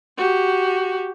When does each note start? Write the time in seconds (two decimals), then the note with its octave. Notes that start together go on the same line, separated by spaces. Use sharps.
0.17 F#4 G4